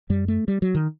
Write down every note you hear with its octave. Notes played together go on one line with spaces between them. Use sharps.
F#2 G3
A3
G3
F#3
D#3